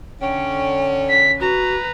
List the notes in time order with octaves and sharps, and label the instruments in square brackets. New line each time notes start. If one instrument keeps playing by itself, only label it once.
[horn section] D3 C#4 [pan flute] G5
[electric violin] B6
[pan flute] F#4 [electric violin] B4 A#5